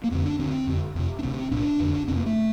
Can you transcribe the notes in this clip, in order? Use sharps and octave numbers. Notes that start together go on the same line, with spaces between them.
A#3
F2 D3 C4
D4
D2 D3 C4
F2 D3
F2 C3
D4
D2 C3 C4
C2 A#2 D4
F2 D3
F2 C3 C4
A#3
A3